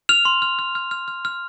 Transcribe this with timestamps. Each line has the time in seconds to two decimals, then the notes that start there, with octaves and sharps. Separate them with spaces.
0.09 F6 F7
0.25 C6
0.42 F6
0.59 F6
0.75 F6
0.91 F6
1.08 F6
1.25 F6